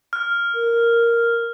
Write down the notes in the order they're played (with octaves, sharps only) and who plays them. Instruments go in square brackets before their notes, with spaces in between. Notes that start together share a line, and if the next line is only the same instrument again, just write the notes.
[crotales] F6
[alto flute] A#4